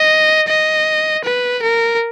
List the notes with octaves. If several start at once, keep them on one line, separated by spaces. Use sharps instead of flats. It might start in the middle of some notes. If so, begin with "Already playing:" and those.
Already playing: D#5
D#5
B4
A#4